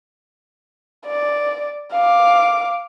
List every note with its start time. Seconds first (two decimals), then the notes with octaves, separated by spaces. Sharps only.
1.06 D5
1.93 F5 D6